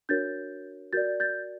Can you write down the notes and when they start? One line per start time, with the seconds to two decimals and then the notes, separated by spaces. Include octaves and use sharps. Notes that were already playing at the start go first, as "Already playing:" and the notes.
0.09 D4 F#4 A#4 C#5 G6 A6
0.93 F#4 A#4 D5 G6 A6
1.20 G6 A6